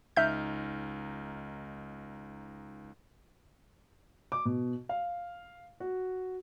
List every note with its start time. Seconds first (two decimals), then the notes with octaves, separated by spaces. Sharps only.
0.17 C#2 D#4 E5 F6 G6
4.32 D6
4.45 B2
4.89 F5
5.80 F#4